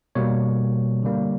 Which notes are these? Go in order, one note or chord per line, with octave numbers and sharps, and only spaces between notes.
B2 G3 A#3 C#5
D3 G3 A#3